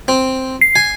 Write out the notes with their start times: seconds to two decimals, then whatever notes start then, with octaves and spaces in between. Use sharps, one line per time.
0.08 C4
0.61 C7
0.76 G#5